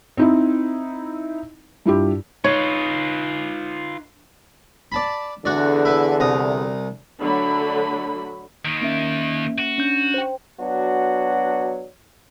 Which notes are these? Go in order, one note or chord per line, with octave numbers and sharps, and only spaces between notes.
C4 D#4 E4
G2 E4 F4 G4
D#4 F4 B4 C#5
D5 A5 B5
E2 D3 F#4 D5
E4 B4
C2 A#5 D#6
D3 F#3 A3 B5
D#2 D#3
A#3 C#4 E5
F#4
C#4 D4 G6
C5 G5
F#3 B3 D4 F#4